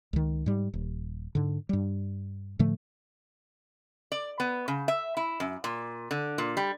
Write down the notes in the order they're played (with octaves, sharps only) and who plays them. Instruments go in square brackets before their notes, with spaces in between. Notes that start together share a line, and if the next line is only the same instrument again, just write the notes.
[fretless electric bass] C#2 D#3
G#2 G3
D#1
G#2 D3
G2 G3
A2 D3 F3 A3
[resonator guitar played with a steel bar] D5
B3
C#3
E5
E4
F#2
A#2
D3
A#2
G3